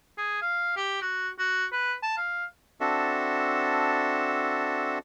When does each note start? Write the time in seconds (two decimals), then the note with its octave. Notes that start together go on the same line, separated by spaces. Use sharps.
0.18 G#4
0.42 F5
0.76 G4
1.02 F#4
1.39 F#4
1.72 B4
2.03 A5
2.17 F5
2.80 C4 D4 F#4 A4 E5